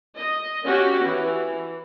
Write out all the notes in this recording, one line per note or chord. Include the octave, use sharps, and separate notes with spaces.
D#5
C#4 F#4 G4
E3